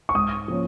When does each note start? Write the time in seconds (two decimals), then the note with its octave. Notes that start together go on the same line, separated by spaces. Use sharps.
0.09 C#6
0.15 G#2 D#6
0.48 F3 A#3 C#4